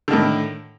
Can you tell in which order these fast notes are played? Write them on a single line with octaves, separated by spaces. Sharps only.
D3 D#3 A2